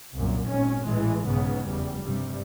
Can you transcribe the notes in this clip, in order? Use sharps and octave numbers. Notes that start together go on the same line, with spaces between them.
C2 F#2 A#2
G#1 A#2 C#4
A1 A#2 E3 G#3
B1 G#2 C#3 B3
F1 E2 G3
G2 C3 G3